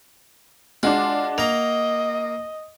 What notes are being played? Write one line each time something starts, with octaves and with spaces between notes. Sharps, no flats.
G#3 D4 F4 F#4
A#3 D#5 A#5 F7